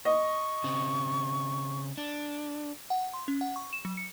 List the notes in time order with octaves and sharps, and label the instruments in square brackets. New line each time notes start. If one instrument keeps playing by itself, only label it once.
[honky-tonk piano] D#5 [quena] C#6
[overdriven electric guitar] C#3 C4
D4
[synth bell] F#5
C6
C#4
F#5
C#6
E7
F#3
C#7